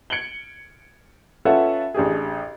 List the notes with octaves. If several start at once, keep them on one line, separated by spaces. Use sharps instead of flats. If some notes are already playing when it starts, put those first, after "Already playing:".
G#6 C#7 D7 F#7 G7
C#4 F4 A4 B4 E5 F#5
A1 D4 G4 G#4